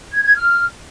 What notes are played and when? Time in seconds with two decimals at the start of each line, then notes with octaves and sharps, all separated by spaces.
0.12 G#6
0.23 G#6
0.35 F6